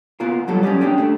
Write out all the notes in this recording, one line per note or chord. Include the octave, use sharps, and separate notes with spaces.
B3 F4 F#4 A#4
F#3 G3 F#4 A4
C#4 G4 G#4 D5
C#4 D4 G4 G#4
A3 D4